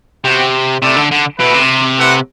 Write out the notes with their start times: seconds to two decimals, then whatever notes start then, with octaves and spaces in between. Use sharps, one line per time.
0.24 C3 B3 F#4 C5 G5
0.82 C3 A3 E4 A4 D5
0.96 D3
1.11 D3
1.39 B2 A3 E4 B4
1.54 C3
1.97 A3 E4 B4 F#5